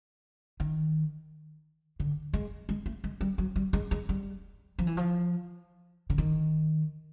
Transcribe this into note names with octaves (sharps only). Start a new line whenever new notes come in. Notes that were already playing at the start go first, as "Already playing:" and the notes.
D#3
D3
G#3
G#3
A3
G#3
G3
F#3
G3
G#3
G#3
G3
F3
E3
F3
D3
D#3